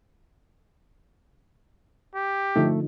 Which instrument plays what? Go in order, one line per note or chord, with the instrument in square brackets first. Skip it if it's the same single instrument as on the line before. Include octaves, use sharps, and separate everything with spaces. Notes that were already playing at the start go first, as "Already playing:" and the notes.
[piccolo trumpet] G4
[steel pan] D3 F3 D#4 [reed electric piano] A3